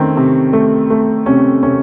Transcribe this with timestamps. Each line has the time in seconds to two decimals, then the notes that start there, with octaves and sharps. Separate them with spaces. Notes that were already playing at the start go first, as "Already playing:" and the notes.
Already playing: D#3 A3 C4 C#4
0.17 C3
0.53 A3
0.90 A3
1.26 C3 C#4
1.63 C3 C#4